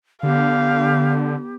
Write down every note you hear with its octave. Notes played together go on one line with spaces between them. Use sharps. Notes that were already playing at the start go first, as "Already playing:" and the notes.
D3 B3 G4 F5